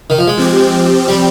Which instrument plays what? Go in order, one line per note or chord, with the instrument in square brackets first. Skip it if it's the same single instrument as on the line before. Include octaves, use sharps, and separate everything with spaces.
[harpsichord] D#3
F3
G#3
[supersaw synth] F3 C4 G4
[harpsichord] G3